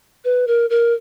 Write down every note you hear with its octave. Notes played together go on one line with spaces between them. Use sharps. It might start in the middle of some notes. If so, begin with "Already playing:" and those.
B4
A#4
A#4